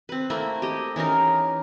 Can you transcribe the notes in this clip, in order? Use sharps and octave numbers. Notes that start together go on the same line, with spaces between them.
C4 B4
A3 A#3 E4
G4 D#5
E3 C#4 D#4 A#4